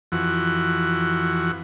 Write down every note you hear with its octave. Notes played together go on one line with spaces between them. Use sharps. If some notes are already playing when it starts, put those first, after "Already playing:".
F2 E3 F#4